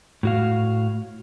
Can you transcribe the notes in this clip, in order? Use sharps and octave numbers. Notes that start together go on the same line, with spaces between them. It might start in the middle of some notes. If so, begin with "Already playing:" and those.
A2 F#4 F5